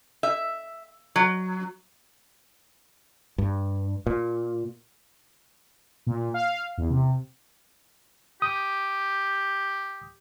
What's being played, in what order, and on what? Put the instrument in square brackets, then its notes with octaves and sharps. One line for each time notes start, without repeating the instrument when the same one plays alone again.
[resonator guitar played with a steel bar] E5
F#3
[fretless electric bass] G2
A#2
[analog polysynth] A#2
F5
E2
C3
[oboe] G4 [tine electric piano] D#6